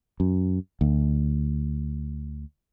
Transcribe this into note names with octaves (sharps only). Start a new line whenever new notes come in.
F#2
D2